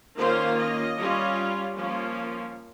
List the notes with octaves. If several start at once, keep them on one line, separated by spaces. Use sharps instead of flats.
D#3 A#3 C#4 F4 C5
D#5
G3 C#4 F4
F3 A#3 C#4 F4